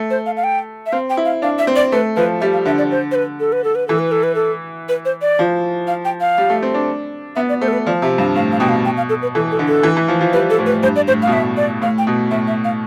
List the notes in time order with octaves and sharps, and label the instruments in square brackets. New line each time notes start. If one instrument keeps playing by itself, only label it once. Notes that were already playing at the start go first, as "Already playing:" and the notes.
Already playing: [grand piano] A3
[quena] C5
F5
F5
G5
E5
[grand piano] C4 [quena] F5
[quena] G5
[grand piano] E4
[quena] F5
[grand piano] D4 [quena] F5
[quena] E5
[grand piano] C4
[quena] D5
[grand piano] A3 [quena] B4
[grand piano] F3 [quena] B4
[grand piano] G3 [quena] E5
[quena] F5
[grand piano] D3 [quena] E5
[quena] D5
C5
C5
B4
A4
B4
A4
B4
[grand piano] E3 [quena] A4
[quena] B4
A4
B4
A4
B4
C5
D5
[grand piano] F3
[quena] F5
G5
F5
[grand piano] G3
A3
C4
D4
[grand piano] B3 [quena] E5
[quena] D5
[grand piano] A3 [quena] C5
[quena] A4
B4
[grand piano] F3 [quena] D5
[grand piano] C3 [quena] E5
[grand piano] G2 [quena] F5
[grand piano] A2 [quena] F5
[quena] F5
[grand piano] B2 [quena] G5
[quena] F5
G5
F5
A4
B4
[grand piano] E3 [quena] A4
[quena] A4
[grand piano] D3
[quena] A4
[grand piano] E3
E3
F3
F3
[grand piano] G3 [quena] B4
[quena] A4
[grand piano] A2
[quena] B4
[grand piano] G2 [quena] C5
[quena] D5
[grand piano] A2 [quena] C5
[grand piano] B2 [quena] F5
[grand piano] A2 [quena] E5
[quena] D5
[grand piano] A2 [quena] F5
[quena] G5
[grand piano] B2
[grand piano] A2 [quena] E5
[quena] E5
F5